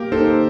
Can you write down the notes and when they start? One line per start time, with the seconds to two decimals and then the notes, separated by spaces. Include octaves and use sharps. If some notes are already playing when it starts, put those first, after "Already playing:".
Already playing: A#3 G4 A#4
0.12 D#4 A4 C5